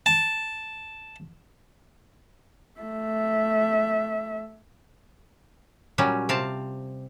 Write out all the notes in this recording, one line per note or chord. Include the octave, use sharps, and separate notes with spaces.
A5
A3 E5
A#2 F#3 G3 C#4
C3 C4 F5 A5